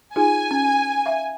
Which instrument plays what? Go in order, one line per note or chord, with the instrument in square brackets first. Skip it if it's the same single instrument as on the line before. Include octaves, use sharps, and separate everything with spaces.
[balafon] D#4 F4 G#4 [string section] G#5
[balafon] C#4
E5 F5